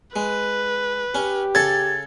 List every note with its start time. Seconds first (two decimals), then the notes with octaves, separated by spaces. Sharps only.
0.16 G#3 B4
1.15 C#4 G4
1.55 C#3 A4 G#6 A6